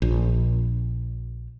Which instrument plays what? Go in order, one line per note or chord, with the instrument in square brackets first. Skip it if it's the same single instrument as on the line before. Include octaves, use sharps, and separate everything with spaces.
[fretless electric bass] A#1